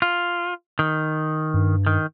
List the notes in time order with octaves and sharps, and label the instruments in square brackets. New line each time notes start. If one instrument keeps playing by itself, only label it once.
[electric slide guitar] F4
D#3
[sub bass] G2
[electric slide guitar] D#3